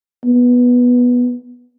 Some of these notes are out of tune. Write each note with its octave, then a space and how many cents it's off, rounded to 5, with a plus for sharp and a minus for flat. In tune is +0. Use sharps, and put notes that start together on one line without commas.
B3 -10